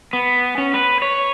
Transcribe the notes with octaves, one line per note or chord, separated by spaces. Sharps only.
B3
C#4
B4
C#5